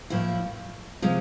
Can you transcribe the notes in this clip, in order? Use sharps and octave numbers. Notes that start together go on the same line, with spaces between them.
A2 F3 A#3 E4
C3 F3 G#3